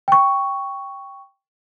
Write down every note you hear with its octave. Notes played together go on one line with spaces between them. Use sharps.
G5 C#6